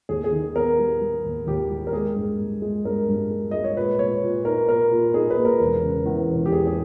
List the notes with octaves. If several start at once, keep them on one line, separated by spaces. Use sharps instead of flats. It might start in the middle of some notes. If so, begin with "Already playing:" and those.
D#2 G#4
G#4
D#3
B3 A#4
G3
G3
D#2
D#2 G4
G3
A#4
G#3 G#4
G2
G2
G#3
G2 A#4
G2
G#3
G#3 D#5
C#5
A#2 B4
A#2 C#5
A#2
D#4 A#4
A#2 A#4
A#2
D#4 G#4
B4
A#3
A#4
E1
C#3
E2
E1
G4
E2 G#4
G#4